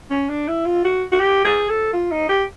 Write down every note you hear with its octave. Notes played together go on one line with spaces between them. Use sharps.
C#4
D4
E4
F4
F#4
F#4
G4
G#4
A4
F4
D#4
G4